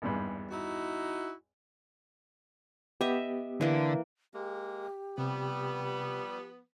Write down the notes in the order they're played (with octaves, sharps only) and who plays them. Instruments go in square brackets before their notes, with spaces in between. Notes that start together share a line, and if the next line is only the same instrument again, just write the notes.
[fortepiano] G#1 E2 G2
[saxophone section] D#4 E4 F#4
[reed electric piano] B3 G4 [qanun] D#5 E5
[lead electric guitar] D3 [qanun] E3 A#3
[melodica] G#3 A#3 [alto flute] G4
[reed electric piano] C3 [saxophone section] F3 B3 [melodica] G3